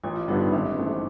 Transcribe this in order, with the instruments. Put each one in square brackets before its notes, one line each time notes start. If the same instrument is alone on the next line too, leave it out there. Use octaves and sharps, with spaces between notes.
[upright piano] A1 [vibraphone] F4
[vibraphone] F4
[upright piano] G2 D3 G3 B3 [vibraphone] D#4
[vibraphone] D4
[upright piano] G#1 [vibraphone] C#4
[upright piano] G#2 E3 A3